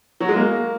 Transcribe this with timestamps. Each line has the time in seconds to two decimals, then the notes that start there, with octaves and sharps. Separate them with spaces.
0.21 F#3
0.29 G#3
0.36 A#3